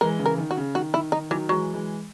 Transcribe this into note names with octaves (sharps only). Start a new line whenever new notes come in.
E3 G#3 A#4
C#3 E3
A#4
D#3
F#4
C#3
D#3 F#4
D#3 E4
D#3 D#4
D#3 E3 F#3
E3 F#3 G#3
E3 G#3